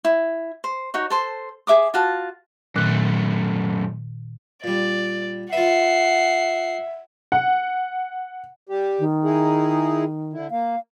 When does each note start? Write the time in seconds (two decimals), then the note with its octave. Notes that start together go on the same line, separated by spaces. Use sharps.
0.05 E4
0.64 C5
0.94 D#4 F#4 C#5
1.10 A4 C5 C6
1.67 G#4 E5 D6 D#6
1.94 F4 F#4 A5
2.76 F#2 A#2 D#3 A3 F#6
4.64 A#2 G3 D5
5.53 F4 B4 E5 F#5 C7
7.32 F#5
8.69 G3 G4
8.99 D#3
9.24 D#4 E4 G#4
10.33 D3 E4
10.51 A#3 F5